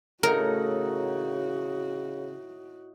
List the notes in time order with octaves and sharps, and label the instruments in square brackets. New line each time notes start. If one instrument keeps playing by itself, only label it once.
[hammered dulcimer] A2 D#4 F#5 [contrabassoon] C#3 [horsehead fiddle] F#4 [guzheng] A#4